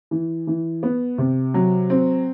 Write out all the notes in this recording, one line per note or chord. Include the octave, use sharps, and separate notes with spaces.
E3
E3
B3
C3
F#3
C4